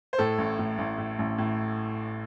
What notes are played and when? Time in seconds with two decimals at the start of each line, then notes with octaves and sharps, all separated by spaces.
0.13 C5
0.18 A2 A4
0.38 A1
0.59 A2
0.78 A1
0.98 A2
1.19 A1
1.38 A2